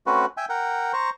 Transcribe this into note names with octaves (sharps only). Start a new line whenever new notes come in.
A3 C4 C#4 F#4 B4
E5 G5 G#5
A#4 F#5 G5
C5 A#5 C#6